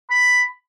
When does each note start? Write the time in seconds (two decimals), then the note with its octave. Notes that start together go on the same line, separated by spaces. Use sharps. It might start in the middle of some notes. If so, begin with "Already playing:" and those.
0.11 B5